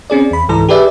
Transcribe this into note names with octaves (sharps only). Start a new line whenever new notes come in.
C4 C#4 G#4 D5
E2 B5
C#2 G#2 E3 A4 A#5
G4 G#4 B4 D5 E5